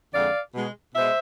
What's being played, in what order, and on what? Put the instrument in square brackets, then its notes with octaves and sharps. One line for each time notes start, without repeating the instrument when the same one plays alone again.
[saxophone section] F2 D3 G#3 D5 F5
B2 G#3
B2 G#3 C5 E5